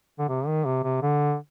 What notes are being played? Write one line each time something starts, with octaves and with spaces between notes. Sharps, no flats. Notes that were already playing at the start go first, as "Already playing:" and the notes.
D3
C3
D#3
C3
C3
D3